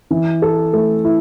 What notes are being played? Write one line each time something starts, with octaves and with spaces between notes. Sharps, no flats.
E3
A4
A3
E4